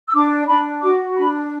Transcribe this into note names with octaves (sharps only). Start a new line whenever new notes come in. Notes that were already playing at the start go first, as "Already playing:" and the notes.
E6
D4 D6
D4 B5
F#4 D6
D4 B5